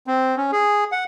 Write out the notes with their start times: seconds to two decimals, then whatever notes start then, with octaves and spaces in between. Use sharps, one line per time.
0.07 C4
0.37 C#4
0.52 G#4
0.92 F#5